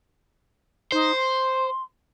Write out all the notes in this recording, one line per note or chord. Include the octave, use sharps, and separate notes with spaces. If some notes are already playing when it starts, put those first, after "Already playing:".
D#4 C5
C6